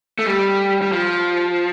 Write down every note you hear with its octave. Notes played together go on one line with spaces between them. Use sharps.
A3
G3
G3
F3